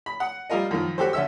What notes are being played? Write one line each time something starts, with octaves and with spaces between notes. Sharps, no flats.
B5
F#5
G3 A#3 F4 A#4 D#5
F#2 D#3 F3
F#4 G4 A4 C5
D3 C#4 E5 E6